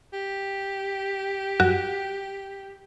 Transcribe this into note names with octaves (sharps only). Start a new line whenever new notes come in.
G4
F#2 F#4